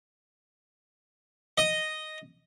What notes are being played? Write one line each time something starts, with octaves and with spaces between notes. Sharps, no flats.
D#5